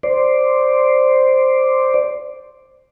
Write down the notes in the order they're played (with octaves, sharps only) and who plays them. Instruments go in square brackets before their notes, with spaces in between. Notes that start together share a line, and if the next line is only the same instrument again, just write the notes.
[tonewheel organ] C5 D5